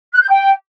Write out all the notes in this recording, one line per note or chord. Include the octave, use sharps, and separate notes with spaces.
F#6
G6
G5